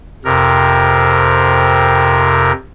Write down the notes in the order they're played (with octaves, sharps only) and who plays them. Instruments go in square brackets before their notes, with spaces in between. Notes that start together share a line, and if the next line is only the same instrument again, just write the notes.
[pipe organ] F2 C3 A#4